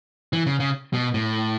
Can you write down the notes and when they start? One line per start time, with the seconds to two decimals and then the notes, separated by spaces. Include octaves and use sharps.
0.33 E3
0.46 C#3
0.60 C#3
0.93 B2
1.14 A2